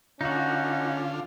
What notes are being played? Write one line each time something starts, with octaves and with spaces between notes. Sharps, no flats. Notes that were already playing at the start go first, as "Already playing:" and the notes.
D3 C#4 D#4 F4 F#4